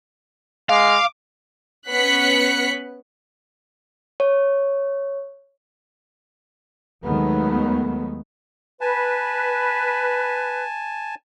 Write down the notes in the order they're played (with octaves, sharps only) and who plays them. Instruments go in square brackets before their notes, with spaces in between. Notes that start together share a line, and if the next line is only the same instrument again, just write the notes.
[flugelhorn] G#3 [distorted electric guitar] F5 [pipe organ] D6
[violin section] B3 C#4 F#6 B6 C#7
[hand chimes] C#5
[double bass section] D#2 D#3 F#3 G#3 A3 B3
[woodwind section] B4 [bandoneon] G#5 A5